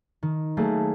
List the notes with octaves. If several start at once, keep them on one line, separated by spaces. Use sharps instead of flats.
D#3
F#3 A3 A#3 G#4